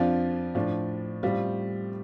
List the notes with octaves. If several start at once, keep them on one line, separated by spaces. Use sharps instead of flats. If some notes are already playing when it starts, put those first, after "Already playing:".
Already playing: F2 F3 D4 F4
A2 F3 D4
A2 G3 C4 F4